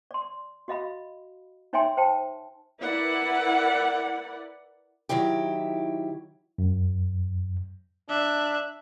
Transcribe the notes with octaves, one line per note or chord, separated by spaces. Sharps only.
D5 C6
F#4 D#5 F5 B5
D#4 C#5 E5 G5 G#5 C6
C5 G5 A5
E4 A#4 B4 D5 F#5
D#3 F#3 E4 G4
F#2
D4 E5 F#6